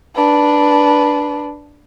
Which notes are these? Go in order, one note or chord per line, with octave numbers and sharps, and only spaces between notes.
D4 B4